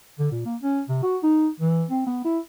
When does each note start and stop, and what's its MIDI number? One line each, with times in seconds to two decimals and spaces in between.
0.19 0.30 50
0.32 0.41 46
0.45 0.56 58
0.63 0.81 61
0.89 0.98 48
1.03 1.18 66
1.23 1.48 63
1.60 1.85 52
1.90 2.04 60
2.07 2.20 59
2.25 2.38 64